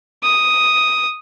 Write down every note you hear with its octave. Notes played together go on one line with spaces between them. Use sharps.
D#6